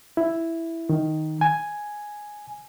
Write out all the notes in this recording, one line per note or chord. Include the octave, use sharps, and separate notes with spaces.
E4
D#3
G#5